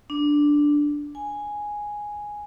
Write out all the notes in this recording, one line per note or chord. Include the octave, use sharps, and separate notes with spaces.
D4
G#5